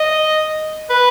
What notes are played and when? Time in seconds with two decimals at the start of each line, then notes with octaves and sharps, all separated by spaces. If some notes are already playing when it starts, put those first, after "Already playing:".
Already playing: D#5
0.90 B4